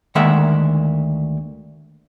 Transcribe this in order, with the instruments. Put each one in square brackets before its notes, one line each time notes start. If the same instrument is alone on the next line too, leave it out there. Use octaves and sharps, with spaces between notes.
[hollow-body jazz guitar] D2 D#3 G#3 A#3 E5 F#5